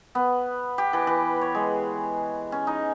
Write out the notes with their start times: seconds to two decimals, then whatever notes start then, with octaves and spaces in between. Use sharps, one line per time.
0.15 B3
0.78 G4
0.93 E3
1.07 E3
1.41 C#5
1.55 G#3
2.52 C#4
2.67 D#4